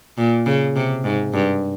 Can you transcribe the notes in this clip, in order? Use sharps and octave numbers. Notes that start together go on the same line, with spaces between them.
A#2
C#3
C3
G#2
G2